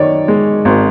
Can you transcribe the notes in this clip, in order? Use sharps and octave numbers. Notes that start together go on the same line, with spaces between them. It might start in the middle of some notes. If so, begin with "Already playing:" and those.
Already playing: F#2 D#3 C#5 D5
G#3
G#1